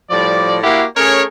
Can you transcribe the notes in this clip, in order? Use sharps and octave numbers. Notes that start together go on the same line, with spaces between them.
A2 F3 G3 D5
A#3 E4 F#4 G4 F5 F#5
A3 C#4 G#4 A#4 C#5